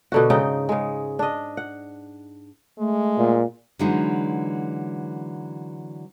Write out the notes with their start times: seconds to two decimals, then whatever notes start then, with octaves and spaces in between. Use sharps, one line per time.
0.12 B2 D3 F#4
0.30 G#2 C#3 D#4 G5
0.69 C#3 G#3
1.19 D4 D#5
1.57 F#5
2.78 G#3 A3
3.17 A#2
3.79 D3 E3 F#3 G#3 D#4